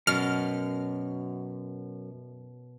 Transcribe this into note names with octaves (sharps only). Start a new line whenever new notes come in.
F#2 B2 F6